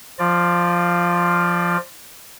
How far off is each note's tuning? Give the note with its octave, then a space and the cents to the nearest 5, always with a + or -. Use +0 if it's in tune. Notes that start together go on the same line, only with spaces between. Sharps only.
F3 +0 F4 +0 D5 +20